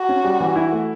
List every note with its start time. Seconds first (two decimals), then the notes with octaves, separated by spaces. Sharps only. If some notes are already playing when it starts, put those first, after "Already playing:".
Already playing: F#4
0.09 C#4
0.24 G3
0.40 E3
0.56 E4
0.72 A3